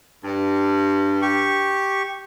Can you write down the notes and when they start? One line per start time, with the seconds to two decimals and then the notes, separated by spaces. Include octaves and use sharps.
0.24 G2
1.22 G4 C#6